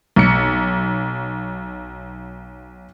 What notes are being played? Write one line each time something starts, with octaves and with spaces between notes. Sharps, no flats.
B1 C#7